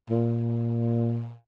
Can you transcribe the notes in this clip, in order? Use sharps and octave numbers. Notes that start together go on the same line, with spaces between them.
A#2